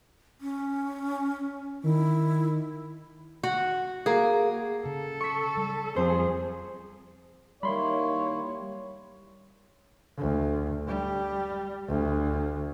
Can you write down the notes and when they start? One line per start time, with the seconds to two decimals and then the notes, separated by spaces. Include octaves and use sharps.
0.41 C#4
1.83 D#3 E4
3.43 F#4 F#5
4.06 A#3 G#4
4.85 C#3 A4
5.21 C#6 B6
5.57 G3
5.96 F2 G#4 C5
7.63 D#3 G3 A#3 E4 C#5 B5 C6
10.18 D2
10.87 G3
11.88 D2